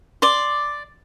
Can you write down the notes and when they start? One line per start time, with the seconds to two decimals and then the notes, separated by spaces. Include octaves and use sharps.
0.22 D5 C6